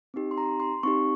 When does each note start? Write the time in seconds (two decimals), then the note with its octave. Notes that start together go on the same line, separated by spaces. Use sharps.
0.14 C4 D#4 G4
0.31 C6
0.38 A#5
0.60 C6
0.83 C4 D#4 G4 C#6